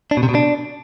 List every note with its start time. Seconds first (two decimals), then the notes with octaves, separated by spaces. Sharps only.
0.11 D4
0.17 B2
0.23 C3
0.29 B2
0.35 D4